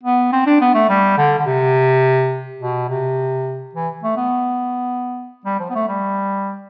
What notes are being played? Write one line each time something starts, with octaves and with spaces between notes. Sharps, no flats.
B3
C4
D4
B3
A3
G3
D3
D3
C3
B2
C3
E3
A3
B3
G3
F3
B3
A3
G3